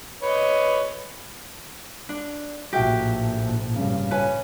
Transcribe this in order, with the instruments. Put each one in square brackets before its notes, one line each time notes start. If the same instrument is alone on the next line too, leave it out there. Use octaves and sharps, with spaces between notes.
[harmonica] B4 C#5 D#5
[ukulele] D4
[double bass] A#1 A2 [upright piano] F#4 E5 G5 [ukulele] G4
[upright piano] G2 C#3
[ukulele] C#4 B4 G#5